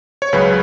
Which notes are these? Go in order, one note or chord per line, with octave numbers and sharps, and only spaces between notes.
C#5
C#2 C#3 F#3 B4